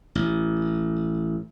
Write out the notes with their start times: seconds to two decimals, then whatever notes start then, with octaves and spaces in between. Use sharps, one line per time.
0.15 A1